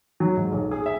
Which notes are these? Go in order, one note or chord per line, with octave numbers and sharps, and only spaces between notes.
F#3
G#2
B1
G#4
E5